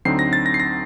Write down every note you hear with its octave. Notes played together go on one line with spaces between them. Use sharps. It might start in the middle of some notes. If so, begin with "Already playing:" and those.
D2 D3 F#3 C4 D#4 C7
A#6
A6
A#6
C7
A#6